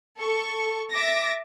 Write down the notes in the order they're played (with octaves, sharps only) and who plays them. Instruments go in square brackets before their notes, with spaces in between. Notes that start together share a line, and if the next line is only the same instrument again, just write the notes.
[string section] A4 C#6
E5 D6 A6 A#6